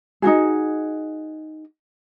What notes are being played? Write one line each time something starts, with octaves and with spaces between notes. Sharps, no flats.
D#4 F4 F#4 G#4